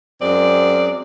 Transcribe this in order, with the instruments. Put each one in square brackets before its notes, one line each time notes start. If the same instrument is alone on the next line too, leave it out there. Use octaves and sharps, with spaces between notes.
[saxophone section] F#2 G#3 C4 D5